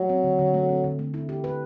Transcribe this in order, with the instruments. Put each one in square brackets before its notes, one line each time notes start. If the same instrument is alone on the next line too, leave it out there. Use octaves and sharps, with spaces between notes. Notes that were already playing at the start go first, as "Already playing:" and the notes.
Already playing: [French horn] F#3 [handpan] A3
[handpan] C4
D3
D3
A3
C4
D3
A3
E4
G4
B4